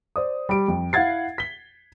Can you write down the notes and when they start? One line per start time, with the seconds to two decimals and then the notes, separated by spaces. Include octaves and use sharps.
0.16 C5 D5 D#6
0.49 G3 D7
0.68 F2
0.93 E4 F5 F#5 G#6 A6 C7
1.38 B6 G7